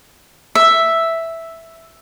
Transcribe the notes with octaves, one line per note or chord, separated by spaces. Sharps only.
E5